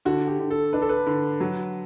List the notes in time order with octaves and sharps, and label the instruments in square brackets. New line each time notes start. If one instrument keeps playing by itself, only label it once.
[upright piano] D3 [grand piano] F#4
[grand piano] G4
[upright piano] D3
[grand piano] A4
[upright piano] D4 [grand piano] B4
[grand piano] A4
B4
[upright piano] D3
F#3